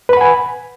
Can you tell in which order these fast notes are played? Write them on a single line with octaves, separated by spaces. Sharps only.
B4 B5 F#5 G#5